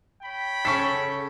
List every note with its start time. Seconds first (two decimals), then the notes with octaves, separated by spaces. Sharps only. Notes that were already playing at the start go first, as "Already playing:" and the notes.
0.22 C#5 G5 B5
0.65 C#3 C#4 A4 C#6 B6